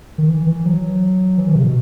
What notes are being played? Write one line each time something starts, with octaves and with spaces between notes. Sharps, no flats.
D#3
E3
E3
F#3
E3
D#3
C3
B2